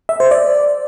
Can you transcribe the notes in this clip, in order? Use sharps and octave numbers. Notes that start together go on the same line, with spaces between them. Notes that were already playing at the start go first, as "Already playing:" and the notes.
E5
C5
D5